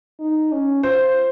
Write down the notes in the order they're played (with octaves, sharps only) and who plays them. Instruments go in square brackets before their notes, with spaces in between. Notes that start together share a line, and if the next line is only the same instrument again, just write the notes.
[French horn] D#4
C#4
[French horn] F4 [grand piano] C5